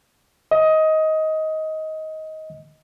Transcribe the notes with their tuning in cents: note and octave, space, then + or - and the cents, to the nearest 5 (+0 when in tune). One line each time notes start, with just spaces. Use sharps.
D#5 +15